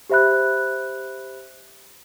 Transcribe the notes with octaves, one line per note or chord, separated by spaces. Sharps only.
G4 C5 E5 B5 F#6